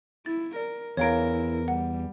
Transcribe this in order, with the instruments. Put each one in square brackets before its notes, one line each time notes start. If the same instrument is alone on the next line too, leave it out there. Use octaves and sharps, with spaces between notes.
[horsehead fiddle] E4 [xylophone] A6
[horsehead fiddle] A#4 [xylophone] D5
[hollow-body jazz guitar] E2 A#5 [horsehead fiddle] E4 A#4 [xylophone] C#5 F5 D7
[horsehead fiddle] G3 [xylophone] F#5